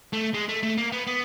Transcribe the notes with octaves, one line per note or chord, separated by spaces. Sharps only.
A3
G#3
A3
A3
A#3
B3
B3